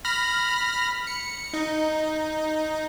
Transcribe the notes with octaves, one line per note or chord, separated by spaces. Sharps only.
B5 F6 A#6
C#7
D#4